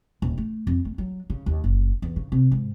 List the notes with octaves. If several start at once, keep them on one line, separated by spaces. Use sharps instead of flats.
D#1
A3
F2
A3
F#3
C#3
D#2
F#1
E2
C#3
C3
G#2